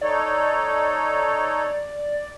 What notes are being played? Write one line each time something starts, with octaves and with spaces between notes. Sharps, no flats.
D#4 A4 C#5 D5